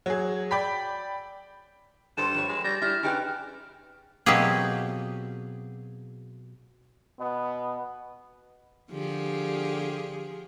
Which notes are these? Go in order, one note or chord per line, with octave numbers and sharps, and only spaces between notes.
F#3 G#4
D5 G5 B5 B6
G2 A4 B4 C5 E7
F3 B4 C#5
G#3
G3 A#6
G3 E4 F6
C#3 D#4 G4 B4
B2 F#3 A#3 C4 G4 G#4
B2 B3
D3 F3 G4 G#4